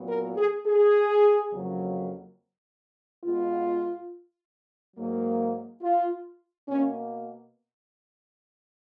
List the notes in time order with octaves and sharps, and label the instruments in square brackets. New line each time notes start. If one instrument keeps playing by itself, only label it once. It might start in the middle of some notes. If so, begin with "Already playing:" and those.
Already playing: [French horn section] A#2 F#3 B3
A#4
G#4
G#4
F2 C#3 F#3 A#3
B2 G#3 B3 F4
G#2 F#3 A#3
F4
B2 A#3 C#4